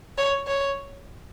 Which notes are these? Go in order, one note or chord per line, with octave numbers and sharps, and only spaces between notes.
C#5
C#5